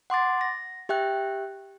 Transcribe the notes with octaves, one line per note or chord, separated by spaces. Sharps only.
F#5 C6 D6 A6
A#6
G4 E5 G5 F#6